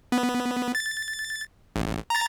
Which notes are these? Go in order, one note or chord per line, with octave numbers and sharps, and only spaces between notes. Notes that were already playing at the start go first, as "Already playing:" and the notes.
B3
A6
A1
A#5 A6